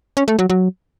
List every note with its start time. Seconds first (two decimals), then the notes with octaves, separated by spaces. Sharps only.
0.17 C#4
0.28 A3
0.39 F#3
0.50 F#3